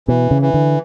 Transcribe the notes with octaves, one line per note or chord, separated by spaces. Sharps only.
B2 E3
C#3
E3
D3